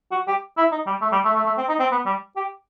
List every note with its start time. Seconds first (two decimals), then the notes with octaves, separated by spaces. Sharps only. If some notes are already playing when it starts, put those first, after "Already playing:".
0.11 F#4
0.27 G4
0.57 E4
0.72 D#4
0.87 G3
1.02 A3
1.12 G3
1.25 A3
1.35 A3
1.46 A3
1.57 C4
1.68 D#4
1.80 C4
1.91 B3
2.06 G3
2.36 G4